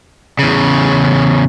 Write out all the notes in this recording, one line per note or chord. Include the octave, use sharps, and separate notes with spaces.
E2 C#3